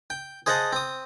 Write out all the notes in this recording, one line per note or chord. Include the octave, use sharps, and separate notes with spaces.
G5
G#4 C5 D#5 F5 F#5 A5
C4 D#6